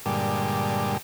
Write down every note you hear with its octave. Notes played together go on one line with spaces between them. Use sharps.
G2 A#2 D3 G3 G#3